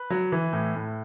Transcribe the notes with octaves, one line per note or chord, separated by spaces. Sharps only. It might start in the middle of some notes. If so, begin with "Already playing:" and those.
Already playing: B4
F#3
E3
A2
A2